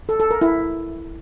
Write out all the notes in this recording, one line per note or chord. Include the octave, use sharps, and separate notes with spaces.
A4
A4
A#4
E4